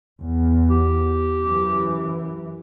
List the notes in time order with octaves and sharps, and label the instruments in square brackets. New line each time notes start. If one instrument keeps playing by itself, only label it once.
[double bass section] E2
[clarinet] G4
[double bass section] F#2 E3